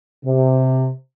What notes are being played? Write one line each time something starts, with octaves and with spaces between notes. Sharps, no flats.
C3